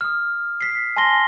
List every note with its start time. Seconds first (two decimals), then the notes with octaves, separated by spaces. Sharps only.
0.01 D#6 F6
0.61 B6 C7
0.96 G#5 A5 C6 A#6 G7